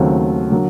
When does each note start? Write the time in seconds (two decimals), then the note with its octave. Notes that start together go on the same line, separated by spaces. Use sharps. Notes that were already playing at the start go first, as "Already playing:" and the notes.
Already playing: D#2 C#3 F#3 A3 C4
0.50 D3 F#3 A#3